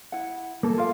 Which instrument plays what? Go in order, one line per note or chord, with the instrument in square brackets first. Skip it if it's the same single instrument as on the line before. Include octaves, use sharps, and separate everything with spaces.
[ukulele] E4 F#5
[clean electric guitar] A#3 A4
[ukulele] F4 A#4 F5